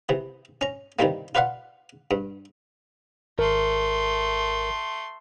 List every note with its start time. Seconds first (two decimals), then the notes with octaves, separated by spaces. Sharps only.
0.09 C3 E3
0.61 C#4 A#5
0.99 C3 D#3 E3 G3 A#3
1.35 F4 B4 D5 F5 F#5
2.11 G2
3.39 G#1 A3 A#4 C6